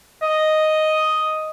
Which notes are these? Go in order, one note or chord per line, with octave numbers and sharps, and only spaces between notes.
D#5